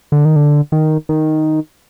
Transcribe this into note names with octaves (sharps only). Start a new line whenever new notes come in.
D3
D#3
D3
D#3
D#3